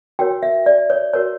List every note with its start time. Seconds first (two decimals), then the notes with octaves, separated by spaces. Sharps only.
0.19 F#4 A#4 C#5 G5
0.43 E5
0.66 D5
0.90 C#5
1.13 F#4 A#4 C#5